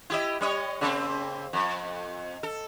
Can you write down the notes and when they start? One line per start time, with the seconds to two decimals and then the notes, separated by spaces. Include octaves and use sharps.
0.10 E4 G4 D#5
0.41 G3 C#5 D#5
0.81 C#3 A#3 C4
1.53 F2
2.43 A4